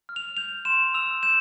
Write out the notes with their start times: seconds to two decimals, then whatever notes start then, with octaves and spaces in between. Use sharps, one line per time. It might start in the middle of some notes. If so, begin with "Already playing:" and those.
0.09 F6
0.16 F7
0.37 G6 F7
0.65 C6 E7
0.94 E6 F7
1.23 G6 E7